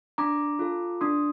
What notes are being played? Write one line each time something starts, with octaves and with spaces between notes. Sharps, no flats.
D4 A#5 D6
F4 A4
D4 C6 D#6